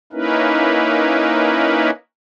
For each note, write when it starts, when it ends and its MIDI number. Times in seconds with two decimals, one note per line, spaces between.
0.13 1.90 58
0.13 1.90 61
0.13 1.90 63
0.13 1.90 64
0.13 1.90 70
0.13 1.90 71